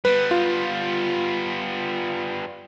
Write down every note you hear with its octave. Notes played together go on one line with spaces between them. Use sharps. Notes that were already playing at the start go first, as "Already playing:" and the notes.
G3 B3 B4
F4